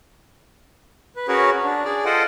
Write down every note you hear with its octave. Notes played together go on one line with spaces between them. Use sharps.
B4
C#4 F#4 G#4 A#4 B4 C#5
D4
G#4 D5
F4 A4 C5 D#5 F#5 G5